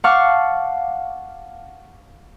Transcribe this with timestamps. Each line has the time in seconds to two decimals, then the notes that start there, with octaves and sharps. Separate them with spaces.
0.04 F5 F#5 A5 C#6 D6 F6